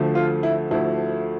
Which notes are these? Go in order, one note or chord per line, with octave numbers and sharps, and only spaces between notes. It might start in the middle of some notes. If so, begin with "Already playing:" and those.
Already playing: D2 D3 F3 A3
F4
E4
D2 D3 F3 A3 E4